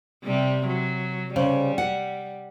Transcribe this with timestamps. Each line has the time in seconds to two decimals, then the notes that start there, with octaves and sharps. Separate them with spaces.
0.25 C3 G3
0.67 F#3
1.36 C#3 G3 C5
1.78 F#5